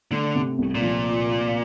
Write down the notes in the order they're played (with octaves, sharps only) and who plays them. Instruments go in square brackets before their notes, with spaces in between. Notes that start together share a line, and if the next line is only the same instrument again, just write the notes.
[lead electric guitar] D3 [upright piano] A3
[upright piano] C3
C2
[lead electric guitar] A#2
[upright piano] F3